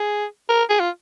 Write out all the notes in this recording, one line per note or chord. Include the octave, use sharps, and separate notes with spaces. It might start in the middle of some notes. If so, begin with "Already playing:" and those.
Already playing: G#4
A#4
G#4
F4